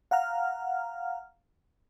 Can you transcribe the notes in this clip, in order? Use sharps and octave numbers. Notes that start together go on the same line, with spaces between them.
F5 F#5 A#5 F6